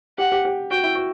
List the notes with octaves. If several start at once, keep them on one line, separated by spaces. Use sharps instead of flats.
G4 F#5
G4
G4
F#4 G5
E4
F#4